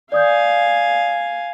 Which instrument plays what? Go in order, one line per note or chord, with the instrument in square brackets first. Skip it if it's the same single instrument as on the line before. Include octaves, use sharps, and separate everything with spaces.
[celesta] D5 D#6 G6 [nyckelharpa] F5 G#5